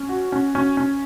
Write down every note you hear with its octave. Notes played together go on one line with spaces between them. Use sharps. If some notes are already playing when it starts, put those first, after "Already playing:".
Already playing: C#4
F#4
C#4
C#4
C#4